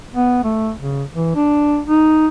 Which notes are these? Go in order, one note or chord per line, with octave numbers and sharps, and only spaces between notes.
B3
A3
C#3
E3
D4
D#4